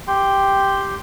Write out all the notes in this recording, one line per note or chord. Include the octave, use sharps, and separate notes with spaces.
G4 G5 C6